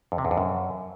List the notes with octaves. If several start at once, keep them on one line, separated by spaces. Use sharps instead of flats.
F2
C3
E2
F2
F#2